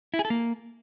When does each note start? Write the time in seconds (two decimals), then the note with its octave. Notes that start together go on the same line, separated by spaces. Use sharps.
0.14 E4
0.19 G#4
0.25 A4
0.30 A#3